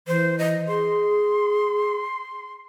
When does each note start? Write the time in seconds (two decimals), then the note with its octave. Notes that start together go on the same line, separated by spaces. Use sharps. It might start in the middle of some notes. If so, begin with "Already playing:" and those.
0.07 E3 C5
0.39 D#5
0.68 G#4 C6